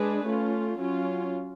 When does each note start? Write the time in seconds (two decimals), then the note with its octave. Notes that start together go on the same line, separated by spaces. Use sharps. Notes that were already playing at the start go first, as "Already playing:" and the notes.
Already playing: G#3 D4 G#4 B4
0.25 A3 C#4 F4
0.78 F#3 C#4 F4